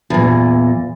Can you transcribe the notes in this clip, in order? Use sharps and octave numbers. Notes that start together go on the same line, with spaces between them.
E2 A#2